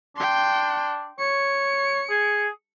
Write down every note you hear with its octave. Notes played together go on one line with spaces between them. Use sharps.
D4 G5 C6
C#5 C#7
G#4